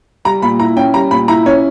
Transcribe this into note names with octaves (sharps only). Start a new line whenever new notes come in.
G3 A#5
A#2 B5
E4 A#5
C#4 G5
G3 A#5
A#2 B5
E4 A#5
C#4 C#5